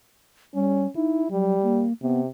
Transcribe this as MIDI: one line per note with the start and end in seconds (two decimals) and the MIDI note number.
0.55 0.87 55
0.55 0.88 61
0.96 1.24 63
0.96 1.27 64
1.31 1.56 54
1.31 1.84 55
1.63 1.93 58
2.02 2.28 48
2.02 2.21 59